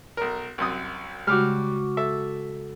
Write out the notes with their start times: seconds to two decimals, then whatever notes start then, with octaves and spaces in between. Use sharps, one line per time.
0.17 B1 A#4
0.58 C2 F#2 D#6
1.27 C#3 G3 G#3 F#4 D6 F6
1.97 A4 E5